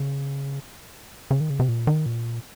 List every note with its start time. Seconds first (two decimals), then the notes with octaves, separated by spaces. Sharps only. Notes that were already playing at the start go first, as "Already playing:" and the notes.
Already playing: C#3
1.31 C#3
1.41 D#3
1.50 C#3
1.60 C3
1.68 A#2
1.87 D#3
2.06 A#2